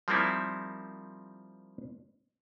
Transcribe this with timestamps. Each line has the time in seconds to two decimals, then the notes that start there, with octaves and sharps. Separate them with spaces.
0.08 F3 G3 A#3 C4 D#4 E4